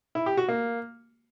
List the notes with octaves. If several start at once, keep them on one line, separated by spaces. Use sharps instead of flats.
E4
G4
F#4
A#3